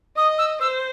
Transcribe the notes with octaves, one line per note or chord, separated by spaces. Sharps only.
D#5 D#6
E6
C5 E6